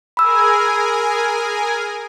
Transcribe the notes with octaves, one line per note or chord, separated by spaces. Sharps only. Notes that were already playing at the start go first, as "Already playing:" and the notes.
G#4 A#4 G#5 B5 E6